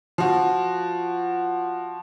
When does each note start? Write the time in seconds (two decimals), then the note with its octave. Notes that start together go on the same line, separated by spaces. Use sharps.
0.18 F3 F#4